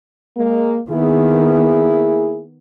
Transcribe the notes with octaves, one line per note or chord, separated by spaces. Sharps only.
G#3 A#3
D#3 A#3 B3 E4 G#4